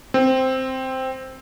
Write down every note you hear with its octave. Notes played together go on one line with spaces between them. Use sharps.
C4